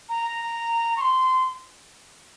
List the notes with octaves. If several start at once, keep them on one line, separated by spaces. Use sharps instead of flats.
A#5
C#6
C6